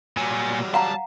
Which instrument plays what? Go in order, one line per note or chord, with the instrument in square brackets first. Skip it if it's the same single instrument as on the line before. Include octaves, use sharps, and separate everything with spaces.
[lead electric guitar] A#2 G#5 [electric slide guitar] F#3 G3
[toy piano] F5 F#5 A#5 [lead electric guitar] A5